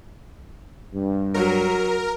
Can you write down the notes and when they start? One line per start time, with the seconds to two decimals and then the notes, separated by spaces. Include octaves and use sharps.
0.94 G2
1.34 F#3 A#4